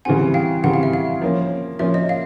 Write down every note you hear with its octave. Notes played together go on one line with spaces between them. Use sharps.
C#3 E3 G3 C4 F#5 G#5
F5 G5
C#3 E3 G3 C4 F#5
F5
E5
F5
F3 A#3 C#4
F3 A#3 C#4 E5
D#5
F5